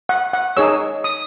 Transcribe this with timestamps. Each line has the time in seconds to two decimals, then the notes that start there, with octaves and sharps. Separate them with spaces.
0.09 F#5
0.33 F#5
0.57 D#4 G#4 C#5 E6
1.04 D#6